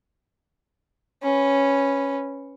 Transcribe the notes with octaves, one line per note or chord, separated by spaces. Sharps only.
C#4 B4